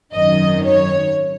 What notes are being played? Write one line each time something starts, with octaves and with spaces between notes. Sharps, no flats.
G#1 F#2 D#3 F#3 D#5
C#5